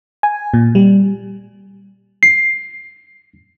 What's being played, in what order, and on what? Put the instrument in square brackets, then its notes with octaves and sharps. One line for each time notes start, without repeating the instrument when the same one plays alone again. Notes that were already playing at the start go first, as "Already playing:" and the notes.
[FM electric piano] G#5
A#2
G3
[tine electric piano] C7